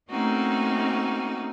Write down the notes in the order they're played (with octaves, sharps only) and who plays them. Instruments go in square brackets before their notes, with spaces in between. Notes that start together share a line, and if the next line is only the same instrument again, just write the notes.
[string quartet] A3 A#3 C4 C#4 D#4 F#4